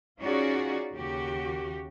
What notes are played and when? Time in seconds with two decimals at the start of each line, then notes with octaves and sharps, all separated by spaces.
0.20 C#4 D#4 F4 F#4 G#4 D5
0.93 D#2 C#3 F#4 G4